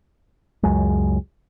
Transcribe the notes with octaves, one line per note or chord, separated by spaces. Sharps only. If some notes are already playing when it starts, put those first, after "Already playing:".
C#2 F#2 F#3 G#3